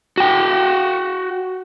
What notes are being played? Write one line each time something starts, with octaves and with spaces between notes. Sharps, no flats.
F#4 G5